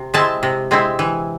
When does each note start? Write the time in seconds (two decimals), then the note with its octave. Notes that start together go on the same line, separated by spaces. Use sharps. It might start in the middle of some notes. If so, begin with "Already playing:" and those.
Already playing: C3
0.14 G#3 C4 E4 A5
0.43 C3
0.71 G#3 C4 E4
0.99 E3